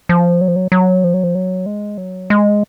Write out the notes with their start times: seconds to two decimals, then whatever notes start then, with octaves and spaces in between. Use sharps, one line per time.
0.09 F3
0.41 F#3
0.48 F3
0.56 F#3
0.72 F#3
1.04 F3
1.14 F#3
1.23 F3
1.35 F#3
1.66 G#3
1.98 F#3
2.30 G#3